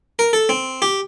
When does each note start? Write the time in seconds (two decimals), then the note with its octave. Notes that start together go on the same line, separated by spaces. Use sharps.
0.19 A#4
0.33 A4
0.49 C4
0.82 G4